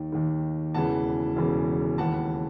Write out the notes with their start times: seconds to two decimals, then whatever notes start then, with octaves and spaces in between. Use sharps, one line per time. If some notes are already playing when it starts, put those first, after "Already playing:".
Already playing: D#2 D#3
0.12 D#2 D#3
0.74 E1 E2 C#3 E3 F#5 A5
1.36 E1 E2 C#3 E3
1.98 D#2 C#3 E3 F#5 A5